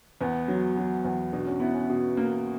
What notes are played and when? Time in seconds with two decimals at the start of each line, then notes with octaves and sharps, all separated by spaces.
0.21 E2 B3
0.48 F#3
0.77 F#3
1.05 E2
1.33 B2 D4
1.46 C#4
1.60 B3 E4
1.74 C#4
1.90 B2
2.17 A#3